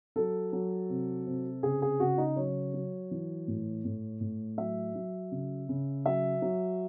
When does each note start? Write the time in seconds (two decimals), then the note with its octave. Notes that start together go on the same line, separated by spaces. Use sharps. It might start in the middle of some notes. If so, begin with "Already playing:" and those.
0.16 F#3 A4
0.53 F#3
0.89 C3
1.27 C3
1.63 C#3 G#4
1.82 G#4
2.00 C#3 F#4
2.18 D#4
2.36 F#3 C#5
2.74 F#3
3.11 E3
3.48 A2
3.85 A2
4.21 A2
4.58 F#3 E5
4.95 F#3
5.32 C#3
5.69 C#3
6.05 F#3 E5
6.42 F#3